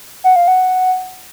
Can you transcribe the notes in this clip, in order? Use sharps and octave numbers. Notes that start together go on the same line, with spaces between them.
F#5
F5
F#5